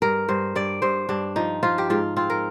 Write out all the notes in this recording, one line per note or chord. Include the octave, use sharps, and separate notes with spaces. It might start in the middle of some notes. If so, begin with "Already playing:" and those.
G2 A#4
G2 C5
G2 D5
G2 C5
G2 D4
F3 D#4
F3 F4
G4
G#2 F4
C4 F4
A#4